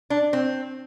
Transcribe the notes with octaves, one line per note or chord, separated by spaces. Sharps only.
D4
C4